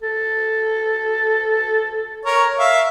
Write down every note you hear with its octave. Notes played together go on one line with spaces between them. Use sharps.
A4
A#4 C#5
E5 F5